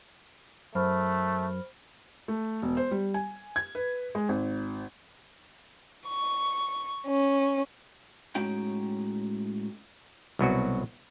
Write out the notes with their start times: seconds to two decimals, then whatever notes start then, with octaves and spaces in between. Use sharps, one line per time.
0.75 F#2 A3 C5 B5 F6
2.28 A3
2.62 E1
2.77 C5
2.91 G3
3.14 G#5
3.56 G#6
3.75 B4
4.15 G#3
4.29 G#1
6.08 C#6
7.07 C#4
8.35 A2 G#3 C#4 D#4 F#4 G5
10.39 C2 B2 F#3 F#4